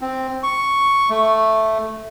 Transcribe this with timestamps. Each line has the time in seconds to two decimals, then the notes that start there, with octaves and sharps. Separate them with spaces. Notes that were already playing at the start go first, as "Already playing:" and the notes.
0.01 C4
0.43 C#6
1.10 A3